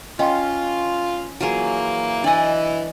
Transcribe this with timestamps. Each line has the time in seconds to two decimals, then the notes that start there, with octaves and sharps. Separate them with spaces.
0.19 C#4 F4 D#5 G5 C6
1.41 E3 F#3 A#3 F4 G#4
2.24 E3 D4 D5 D#5 G#5